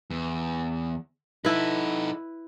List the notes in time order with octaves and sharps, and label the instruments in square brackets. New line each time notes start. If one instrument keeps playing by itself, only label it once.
[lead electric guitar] E2
[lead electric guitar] D#4 A4 [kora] E4 B4